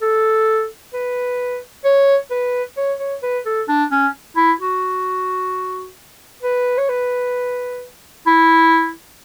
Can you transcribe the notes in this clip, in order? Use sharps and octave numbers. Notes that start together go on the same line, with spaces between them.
A4
B4
C#5
B4
C#5
C#5
B4
A4
D4
C#4
E4
F#4
B4
C#5
B4
E4